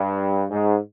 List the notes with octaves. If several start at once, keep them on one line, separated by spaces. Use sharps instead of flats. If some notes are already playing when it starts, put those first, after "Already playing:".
Already playing: G2
G#2